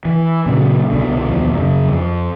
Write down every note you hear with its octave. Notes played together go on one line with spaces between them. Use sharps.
E3
A#2 C#3 F3 F#3
C2 B2 D3
D#2 B2 F3
F#2 C#3
F2